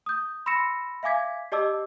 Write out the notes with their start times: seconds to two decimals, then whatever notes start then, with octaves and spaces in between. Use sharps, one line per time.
0.06 D#6 G6
0.46 B5 C6 E6 A#6 C#7 E7
1.03 E5 F5 G#5 D6 G#6 B6
1.52 G4 D5 D#5 A5 D6 E6